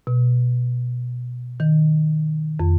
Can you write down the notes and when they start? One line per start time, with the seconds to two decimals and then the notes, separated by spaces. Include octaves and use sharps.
0.07 B2
1.60 D#3
2.60 F2